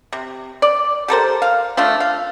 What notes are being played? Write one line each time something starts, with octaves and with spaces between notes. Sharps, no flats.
C3
D5
G4 A4 A#4 C5
F5
F3 A3 D4 F4
F5